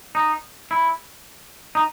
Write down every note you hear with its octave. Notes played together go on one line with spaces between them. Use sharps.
D#4
E4
D#4